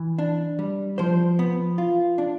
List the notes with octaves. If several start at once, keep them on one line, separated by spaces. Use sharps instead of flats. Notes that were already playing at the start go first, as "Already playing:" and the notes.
Already playing: E3
D4
G3
F3 C5
B3
F4
D4